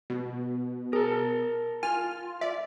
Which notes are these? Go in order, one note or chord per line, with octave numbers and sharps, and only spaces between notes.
B2
G#4 A#4 A5
F4 G#5 F6
D5 E5